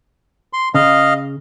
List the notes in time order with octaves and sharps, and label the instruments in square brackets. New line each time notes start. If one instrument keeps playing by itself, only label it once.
[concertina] C6
[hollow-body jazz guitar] C#3 [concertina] D#5 F5